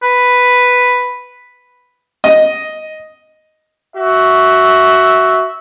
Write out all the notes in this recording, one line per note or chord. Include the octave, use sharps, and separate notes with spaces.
B4
D#5
F#4 E5